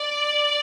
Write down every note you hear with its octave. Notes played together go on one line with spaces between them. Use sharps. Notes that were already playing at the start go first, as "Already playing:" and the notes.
Already playing: D5